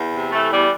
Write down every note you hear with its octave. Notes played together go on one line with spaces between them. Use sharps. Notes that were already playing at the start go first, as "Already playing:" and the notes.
Already playing: E2
C3
E3 A3
E2 G3